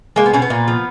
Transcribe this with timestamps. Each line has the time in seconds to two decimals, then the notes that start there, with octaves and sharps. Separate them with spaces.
0.16 G#3 A#3
0.26 B3
0.34 B2 C#4
0.42 B3
0.50 A#2
0.68 F3